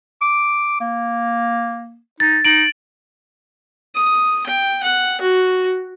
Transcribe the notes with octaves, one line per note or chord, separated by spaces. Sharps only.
D6
A#3
D#4 A6
D#4 D7 F#7
D#6
G5
F#5
F#4